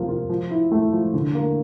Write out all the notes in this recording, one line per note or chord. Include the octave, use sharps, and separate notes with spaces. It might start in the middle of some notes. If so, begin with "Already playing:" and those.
Already playing: C3 F3 A#3
F4
F3
E4
A3
F3
D3
A#3